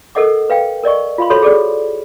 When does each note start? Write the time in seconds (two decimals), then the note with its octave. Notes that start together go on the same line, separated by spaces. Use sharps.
0.15 A4 A#4 D#5 F#5 D6
0.50 B4 F5 G5
0.84 A#4 D5 D#5 C#6
1.18 F4 F5 B5 C6
1.30 F#4 A4 C5 C#5 B5 C6
1.43 G#4 A4 D5